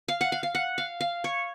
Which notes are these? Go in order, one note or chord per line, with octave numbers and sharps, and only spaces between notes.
F5
F#5
F5
F5
F#5
F5
F5
C#5